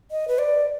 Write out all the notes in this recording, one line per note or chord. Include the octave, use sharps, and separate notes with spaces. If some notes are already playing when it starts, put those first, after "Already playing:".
D#5
B4
D5